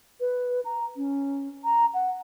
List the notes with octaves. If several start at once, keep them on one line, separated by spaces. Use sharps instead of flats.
B4
A#5
C#4
A#5
F#5